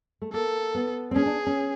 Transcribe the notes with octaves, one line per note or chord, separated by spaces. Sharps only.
A3
A#3 A4
B3
C4
C#4 G#4
D4
C#4